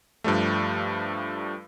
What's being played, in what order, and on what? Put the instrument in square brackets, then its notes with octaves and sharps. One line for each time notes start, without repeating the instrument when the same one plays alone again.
[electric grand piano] G2 F3 G3 A3